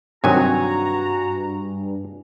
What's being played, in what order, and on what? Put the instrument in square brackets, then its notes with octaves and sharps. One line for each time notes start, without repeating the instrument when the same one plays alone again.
[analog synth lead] G2 [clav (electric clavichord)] C3 D#3 F#3 [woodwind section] F#4 A#5 [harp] G#5